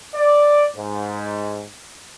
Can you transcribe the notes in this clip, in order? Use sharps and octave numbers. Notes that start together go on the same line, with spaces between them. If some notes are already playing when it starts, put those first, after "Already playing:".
D5
G#2